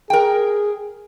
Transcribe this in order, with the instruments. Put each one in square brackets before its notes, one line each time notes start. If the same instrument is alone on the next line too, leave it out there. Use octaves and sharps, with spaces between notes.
[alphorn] G#4 [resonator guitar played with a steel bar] A#4 G5